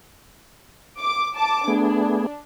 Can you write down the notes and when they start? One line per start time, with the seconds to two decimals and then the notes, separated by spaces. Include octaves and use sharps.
1.00 D6
1.37 A5 D6
1.68 A3 B3 D4 G#4